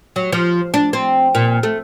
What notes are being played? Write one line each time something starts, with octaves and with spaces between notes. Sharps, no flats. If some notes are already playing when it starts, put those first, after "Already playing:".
F#3
F3
D4
C4
A#2
A3